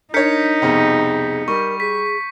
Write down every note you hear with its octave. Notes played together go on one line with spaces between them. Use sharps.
D4 D#4 A#4 C#5 G6 B6 C#7
C2 F2 B2 G#4
G3 A#4 C#6
G#4 B6